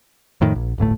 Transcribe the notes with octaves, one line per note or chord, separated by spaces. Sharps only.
F2 A2 D#3
A#1
D1 G1 A2 A3